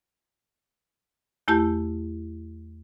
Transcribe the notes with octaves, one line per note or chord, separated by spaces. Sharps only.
E2 A3 E4 G4 A5 G6